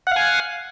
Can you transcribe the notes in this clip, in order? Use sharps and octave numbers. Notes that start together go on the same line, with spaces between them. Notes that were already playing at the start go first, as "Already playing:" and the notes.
F5 F#5 G#5